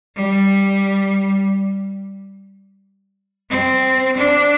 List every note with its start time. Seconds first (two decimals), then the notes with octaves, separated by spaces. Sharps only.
0.16 G3
3.50 C4
4.17 D4